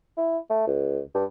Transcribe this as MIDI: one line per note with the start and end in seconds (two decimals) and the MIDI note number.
0.17 0.38 64
0.50 0.63 57
0.67 1.00 37
1.15 1.24 43